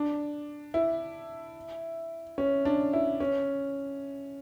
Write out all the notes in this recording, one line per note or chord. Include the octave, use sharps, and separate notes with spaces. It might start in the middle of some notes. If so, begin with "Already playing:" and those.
Already playing: D4
E4
C#4
D4
E4
C#4